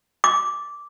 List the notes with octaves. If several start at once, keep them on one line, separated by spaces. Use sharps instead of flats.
D6